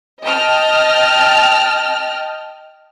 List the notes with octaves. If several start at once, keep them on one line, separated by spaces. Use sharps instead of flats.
D#5 G5 A5 F6